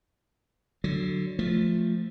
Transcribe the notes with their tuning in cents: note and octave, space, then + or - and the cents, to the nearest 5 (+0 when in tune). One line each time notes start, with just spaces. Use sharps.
D3 +15 F#3 +0
F3 +0 A3 +0